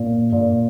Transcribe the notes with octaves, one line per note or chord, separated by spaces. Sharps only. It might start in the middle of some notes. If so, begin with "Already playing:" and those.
Already playing: A#2
A#2